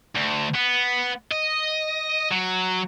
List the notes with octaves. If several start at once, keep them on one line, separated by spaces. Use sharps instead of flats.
D2
B3
D#5
F#3